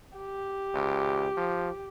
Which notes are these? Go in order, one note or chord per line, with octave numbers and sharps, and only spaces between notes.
G4
C#2
F3